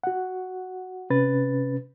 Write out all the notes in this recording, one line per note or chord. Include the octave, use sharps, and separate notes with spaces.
F#4 F#5
C3 C#4 B4 A6